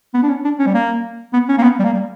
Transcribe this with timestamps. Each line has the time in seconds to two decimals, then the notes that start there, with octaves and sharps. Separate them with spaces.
0.14 B3
0.23 D4
0.29 C#4
0.44 D4
0.59 C#4
0.66 G3
0.74 A#3
1.33 B3
1.49 C#4
1.58 A#3
1.63 B3
1.79 G3
1.84 A#3
1.93 G3